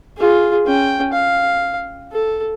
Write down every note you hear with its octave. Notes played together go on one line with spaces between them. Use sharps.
F4 G#4
C#4 G5
F5
A4